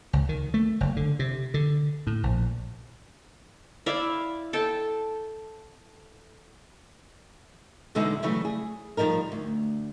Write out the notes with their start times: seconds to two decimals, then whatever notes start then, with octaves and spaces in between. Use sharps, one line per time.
0.13 C#2
0.29 D#3
0.54 A3
0.81 F#1
0.96 D3
1.19 C3
1.54 D3
2.07 A2
2.23 A#1
3.86 E4 D5 E5 F5
4.53 A4 G5 A5
7.95 E2 B2 D3 G#3 D#4 E5
8.22 C#3 E3 F#3 G3 A3
8.45 G#4
8.97 D#3 F3 G3 D#4 A#4
9.32 D2